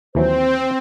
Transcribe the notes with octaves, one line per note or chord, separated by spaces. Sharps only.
D#2 E3 F#3 C4 C5